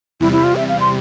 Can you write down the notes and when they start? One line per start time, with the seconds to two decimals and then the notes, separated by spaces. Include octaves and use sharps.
0.20 E2 C3 G3 E4
0.32 E4
0.44 F4
0.56 E5
0.68 F5
0.80 C6